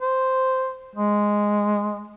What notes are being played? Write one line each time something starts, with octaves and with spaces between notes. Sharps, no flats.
C5
G#3